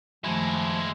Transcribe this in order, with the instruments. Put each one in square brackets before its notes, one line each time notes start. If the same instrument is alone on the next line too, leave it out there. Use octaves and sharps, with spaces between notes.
[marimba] F#2 D#3 A3 [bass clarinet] F3 [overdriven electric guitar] G#3 E4